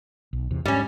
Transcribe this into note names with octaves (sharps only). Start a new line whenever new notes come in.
B1
E2 C3
G#2 G3 C#4